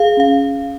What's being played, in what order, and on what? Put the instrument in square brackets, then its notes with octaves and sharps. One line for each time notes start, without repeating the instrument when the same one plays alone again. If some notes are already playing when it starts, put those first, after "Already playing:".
Already playing: [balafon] G#4 [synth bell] F5
[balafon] C#4 [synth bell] F5